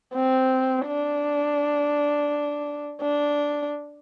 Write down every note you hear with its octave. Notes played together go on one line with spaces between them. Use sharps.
C4
D4
D4